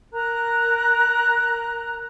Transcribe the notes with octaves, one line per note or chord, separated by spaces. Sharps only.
A#4 A#5 F#6